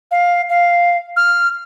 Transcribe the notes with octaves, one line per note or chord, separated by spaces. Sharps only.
F5
F5
F6